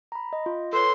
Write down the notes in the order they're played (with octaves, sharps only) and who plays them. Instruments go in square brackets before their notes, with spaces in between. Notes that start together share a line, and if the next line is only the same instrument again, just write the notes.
[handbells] A#5 B5
D#5
F4
[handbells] A4 B4 C#5 [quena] C6